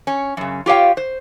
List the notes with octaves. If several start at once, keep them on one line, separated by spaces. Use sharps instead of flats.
C#4
F#2 C#3
F4 G4 C#5 F5 G5
C5